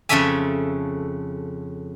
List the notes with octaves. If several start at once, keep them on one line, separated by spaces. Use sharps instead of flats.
F2 C#3 A4 C#5 E5 G#5